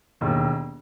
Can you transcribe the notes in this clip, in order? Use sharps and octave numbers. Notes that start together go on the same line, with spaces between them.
E1 D#2 D#3